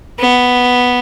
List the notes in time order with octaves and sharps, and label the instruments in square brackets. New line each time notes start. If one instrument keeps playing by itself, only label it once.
[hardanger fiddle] B3